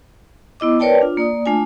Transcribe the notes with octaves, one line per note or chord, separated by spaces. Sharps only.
B3 E4 D#5 D6
A#4 B4 C#5 D5 G5 A5
D4 F4
A#3 D5 D#6
A3 D4 F4 G#5